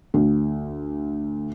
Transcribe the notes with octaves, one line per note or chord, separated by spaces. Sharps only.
D2